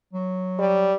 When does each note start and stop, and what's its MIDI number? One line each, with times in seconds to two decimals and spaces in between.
0.13 0.92 54
0.59 0.94 55